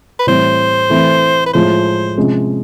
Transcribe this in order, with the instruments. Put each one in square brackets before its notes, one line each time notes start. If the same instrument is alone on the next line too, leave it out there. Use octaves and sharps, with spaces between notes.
[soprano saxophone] B4
[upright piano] A2 E3 G3 C4 [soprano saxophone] C5
[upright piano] E3 A3 C4
[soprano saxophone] B4
[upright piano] A2 F3 G#3 [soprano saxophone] C5
[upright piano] C3 F3 G#3 C#4